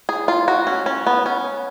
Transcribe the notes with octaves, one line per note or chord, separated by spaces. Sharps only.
G#4
F4
F#4
C#4
C#4
B3
C#4